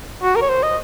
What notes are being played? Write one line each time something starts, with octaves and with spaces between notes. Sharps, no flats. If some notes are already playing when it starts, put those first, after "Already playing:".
F#4
A#4
C#5
C5
D#5